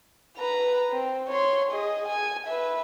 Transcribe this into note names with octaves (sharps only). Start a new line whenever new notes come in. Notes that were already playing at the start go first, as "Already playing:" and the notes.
B4 A#5
C4
C#5 C6
G#4 D#5
G#5
B4 E5